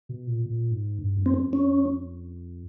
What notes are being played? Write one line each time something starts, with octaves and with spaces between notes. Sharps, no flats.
B2
A#2
A#2
G#2
G2
F#2
C4
F2
C#4